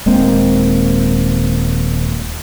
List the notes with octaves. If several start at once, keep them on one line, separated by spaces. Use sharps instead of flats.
D#1 G#3 A#3 C4